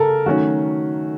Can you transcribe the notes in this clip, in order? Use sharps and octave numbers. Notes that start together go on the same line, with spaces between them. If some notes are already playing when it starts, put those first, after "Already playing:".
Already playing: C#3 A4 A#4
D#3 F#3 A3 C#4 F#4